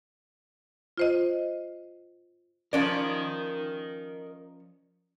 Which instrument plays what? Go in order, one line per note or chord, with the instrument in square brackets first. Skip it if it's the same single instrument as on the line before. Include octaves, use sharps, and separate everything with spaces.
[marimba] F4 C5 D#5
[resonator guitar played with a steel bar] F3 C#4 D5 [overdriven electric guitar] A#4 D#5